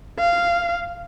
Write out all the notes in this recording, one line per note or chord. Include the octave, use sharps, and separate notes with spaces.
F5